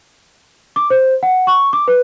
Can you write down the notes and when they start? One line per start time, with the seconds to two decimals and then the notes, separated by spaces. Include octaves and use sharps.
0.76 D6
0.90 C5
1.23 F#5
1.47 C#6
1.73 D6
1.88 B4